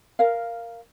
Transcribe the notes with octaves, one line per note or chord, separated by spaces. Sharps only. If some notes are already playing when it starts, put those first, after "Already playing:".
A#4 F5